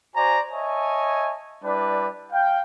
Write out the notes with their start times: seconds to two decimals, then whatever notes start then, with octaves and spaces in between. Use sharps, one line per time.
0.16 F#4 C5 D5 G#5 A#5
0.52 C#5 D#5 E5 G#5 A5
1.64 G3 D4 E4 B4 D5
2.32 F5 G5